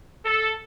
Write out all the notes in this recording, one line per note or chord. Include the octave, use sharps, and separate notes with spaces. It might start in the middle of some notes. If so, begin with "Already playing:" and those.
A4